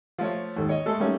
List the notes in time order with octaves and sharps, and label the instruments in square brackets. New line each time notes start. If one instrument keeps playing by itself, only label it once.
[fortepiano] F3 A3 F4 C#5
D#2 G#2 A4
C#5 D#5
G#3 A3 A4
G3 A3 A#3 C#4 D#4